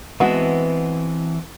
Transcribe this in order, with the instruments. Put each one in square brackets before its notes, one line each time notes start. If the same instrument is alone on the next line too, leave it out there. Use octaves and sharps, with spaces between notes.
[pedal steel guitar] E3 C4 A5 [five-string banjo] G#3 B3 F#4